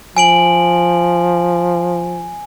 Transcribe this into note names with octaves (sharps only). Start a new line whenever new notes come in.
F3 G#5 D7 F#7